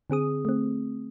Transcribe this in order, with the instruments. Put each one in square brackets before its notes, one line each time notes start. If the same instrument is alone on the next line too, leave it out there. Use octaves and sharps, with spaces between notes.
[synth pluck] D3 C4 G#4 D#6
A3 C4